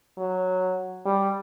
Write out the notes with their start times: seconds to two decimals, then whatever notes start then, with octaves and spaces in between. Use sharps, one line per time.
0.18 F#3
1.06 G3